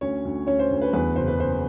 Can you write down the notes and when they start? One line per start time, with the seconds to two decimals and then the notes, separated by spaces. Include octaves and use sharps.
0.01 D2 C#4 C#5
0.25 D2
0.47 D2 C#4 C#5
0.59 C5
0.70 D2
0.82 B4
0.93 E2 B4
1.16 F#1 C5
1.28 B4
1.38 F#1 C5